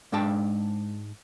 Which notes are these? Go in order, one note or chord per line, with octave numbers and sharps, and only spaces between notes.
G#2 G#3 D4 G5 A5